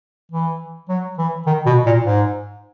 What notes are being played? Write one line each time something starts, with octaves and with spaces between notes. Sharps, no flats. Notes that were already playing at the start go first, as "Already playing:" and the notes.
E3
F#3
E3
D#3
B2
A#2
G#2